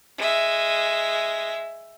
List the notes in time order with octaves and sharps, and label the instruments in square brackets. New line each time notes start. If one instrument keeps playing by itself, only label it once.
[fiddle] G#3 E5